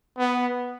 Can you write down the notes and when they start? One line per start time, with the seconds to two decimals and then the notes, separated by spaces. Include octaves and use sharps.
0.18 B3